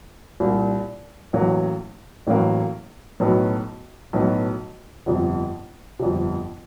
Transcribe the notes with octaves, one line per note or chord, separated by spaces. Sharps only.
C2 A#2 G3
A1 A2 F#3 A#3
A1 A2 F#3 A#3
B1 A2 F#3 B3
B1 A2 F#3 B3
G1 F2 C3
G1 F2 C3